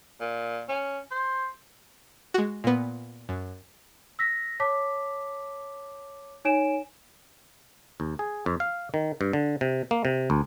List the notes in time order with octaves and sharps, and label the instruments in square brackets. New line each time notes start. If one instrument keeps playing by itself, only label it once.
[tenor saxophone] A#2
C#4
C5
[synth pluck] G#3 F#4
A#2 B3
F#2
[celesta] E6 A#6 B6
C#5 A5 D6 B6
D#4 C#5 G#5 D7 E7
[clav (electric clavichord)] D#2
G#4
F2
F5
D#3
G2
D3
C3
A#3
C3
D2